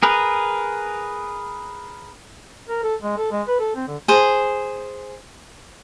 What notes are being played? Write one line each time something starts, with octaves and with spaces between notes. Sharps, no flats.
G#4 A#4 B4
A#4
A4
G#3
A4
G#3
B4
A4
C4
D3
G#4 C5